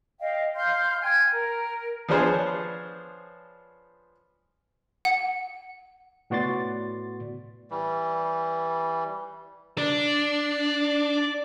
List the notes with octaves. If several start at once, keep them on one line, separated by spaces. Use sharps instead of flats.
D#5 F5 G5
F5 C6 F6 G6
G5 G#5 F6 G#6
A#4
F3 B3 D4 G#4 C5 C#5
F#5
A2 B3 F#4 D5 C6 A6
E3 G3
D4 D5